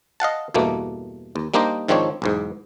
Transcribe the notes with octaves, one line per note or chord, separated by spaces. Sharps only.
D#5 F5 F#5 A5
E2 G2 B2 A3 A#3
D#2
G3 A#3 D4 D#4 C5 D#5
G#2 D#3 F3 C4 D4 C#5
B1 E2 G#2